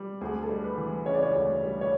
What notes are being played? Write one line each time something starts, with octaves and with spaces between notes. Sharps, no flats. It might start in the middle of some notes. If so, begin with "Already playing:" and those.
Already playing: G3
D2 G#4
A4
G3
B4
E3
C#3 C#5
D5
C#5
D2
G3
C#5